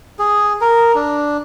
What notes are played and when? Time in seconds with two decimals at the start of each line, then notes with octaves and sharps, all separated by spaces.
0.19 G#4
0.61 A#4
0.95 D4